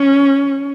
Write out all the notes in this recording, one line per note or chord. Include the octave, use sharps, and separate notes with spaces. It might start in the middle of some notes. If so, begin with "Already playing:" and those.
Already playing: C#4